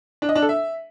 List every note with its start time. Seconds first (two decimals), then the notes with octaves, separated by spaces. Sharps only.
0.22 D4
0.29 D#5
0.35 D4
0.42 A4
0.49 E5